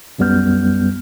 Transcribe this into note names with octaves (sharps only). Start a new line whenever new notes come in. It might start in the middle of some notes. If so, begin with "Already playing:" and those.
B1 F#2 G3 B3 F6 G6